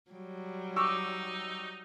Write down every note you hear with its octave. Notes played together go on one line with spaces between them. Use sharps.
F#3 G3
D#4 C#6 D6 E6